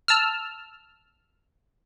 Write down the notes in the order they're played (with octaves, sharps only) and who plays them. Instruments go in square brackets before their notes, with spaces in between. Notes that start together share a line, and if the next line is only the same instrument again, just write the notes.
[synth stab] A5 E6 F6